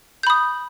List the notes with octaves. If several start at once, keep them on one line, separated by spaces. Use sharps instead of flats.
B5 D#6 G6